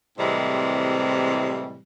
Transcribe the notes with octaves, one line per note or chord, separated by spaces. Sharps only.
A2 C3 E3 G3 G#3 C4